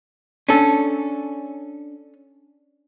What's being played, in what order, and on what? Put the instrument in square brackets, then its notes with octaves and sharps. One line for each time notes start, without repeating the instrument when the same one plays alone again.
[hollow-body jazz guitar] C#4 A4 [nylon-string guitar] D4